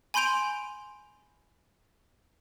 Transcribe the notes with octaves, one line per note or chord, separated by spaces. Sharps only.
G#5 B5 C6 G6 D7 F7